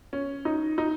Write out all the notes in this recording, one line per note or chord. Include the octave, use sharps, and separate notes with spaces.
C#4
D#4
D#4